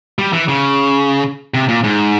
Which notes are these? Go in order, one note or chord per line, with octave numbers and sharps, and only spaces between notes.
G3
E3
C#3
C3
A#2
G#2